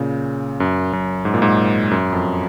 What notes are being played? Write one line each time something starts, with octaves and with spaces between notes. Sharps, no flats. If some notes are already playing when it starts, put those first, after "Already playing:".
Already playing: A#2 C#3
F#2
F#2
G#2
A#2
G#2
F#2
F2